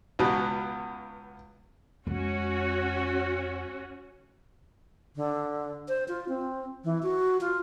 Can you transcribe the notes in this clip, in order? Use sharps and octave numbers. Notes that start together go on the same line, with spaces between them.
C#2 B2 B3
F2 G#3 C#4 F#4
D3
C5
F4
C4
E3
F#4
F4